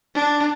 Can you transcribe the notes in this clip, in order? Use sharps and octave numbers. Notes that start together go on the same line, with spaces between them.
D4